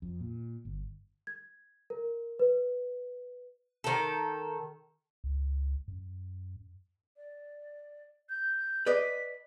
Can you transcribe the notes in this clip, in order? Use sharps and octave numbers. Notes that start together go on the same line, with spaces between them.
F2
A#2
G1
G#6
A#4
B4
D#3 A4
C#2
F#2
D5
G6
B4 D5 D#5 B6